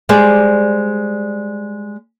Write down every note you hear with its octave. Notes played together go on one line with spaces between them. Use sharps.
G3 G#3 C5 D5